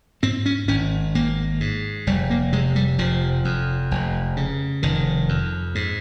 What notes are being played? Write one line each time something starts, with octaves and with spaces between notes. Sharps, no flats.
G#2 C4
C#4
G#1 C#4
G#1 A#3
G#2
F1 G3
A#3
C3 G#3
G3
F1 F3
F2
F1
C#3
F1 D#3
F2
G#2